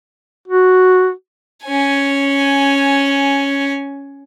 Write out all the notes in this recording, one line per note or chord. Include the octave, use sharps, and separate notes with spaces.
F#4
C#4 G#5